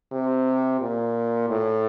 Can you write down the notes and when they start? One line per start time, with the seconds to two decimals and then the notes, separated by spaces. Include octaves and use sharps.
0.12 C3
0.81 A#2
1.50 A2